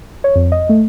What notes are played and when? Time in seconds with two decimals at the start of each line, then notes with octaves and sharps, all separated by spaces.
0.24 C#5
0.35 F2
0.52 D#5
0.69 A3